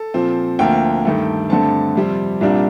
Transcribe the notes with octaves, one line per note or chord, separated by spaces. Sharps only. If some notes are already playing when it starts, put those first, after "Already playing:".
Already playing: A4
A#2 F3 C4
D2 D3 F3 A#3 G5
G2 D#3 A3
G2 D3 A3 C4 A5
F2 C3 G3 C4
C2 A#2 G3 A#3 D4